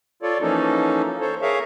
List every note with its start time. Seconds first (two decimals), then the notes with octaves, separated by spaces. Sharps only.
0.23 F4 A4 C#5 D5
0.41 E3 F3 A#3 C#4 D#4 A4
1.21 A4 C5 C#5
1.42 G#4 A#4 C#5 E5 F5